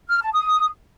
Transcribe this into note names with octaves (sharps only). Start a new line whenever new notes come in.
F6
A5
D#6